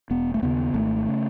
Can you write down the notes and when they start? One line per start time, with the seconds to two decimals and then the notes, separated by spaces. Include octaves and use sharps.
0.10 E1 B3
0.34 A3
0.42 D#2 C#3 B3
0.74 G#1 A3
1.08 C#3